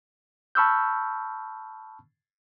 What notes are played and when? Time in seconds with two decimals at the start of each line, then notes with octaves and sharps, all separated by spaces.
0.55 A5 B5 C#6 E6 F6 G6